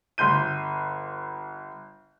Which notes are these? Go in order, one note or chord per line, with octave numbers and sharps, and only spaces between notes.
G1 C6 G6 D#7